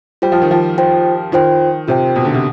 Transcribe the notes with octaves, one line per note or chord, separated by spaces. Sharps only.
G3 F4 C5 G5
F3
D#3
F3
F4 C5 G5
D#3 F4 C5 G5
C3 F4 C5 G5
B2
D3
C3